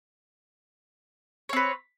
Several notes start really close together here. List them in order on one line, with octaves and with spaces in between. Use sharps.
C#5 C4 B4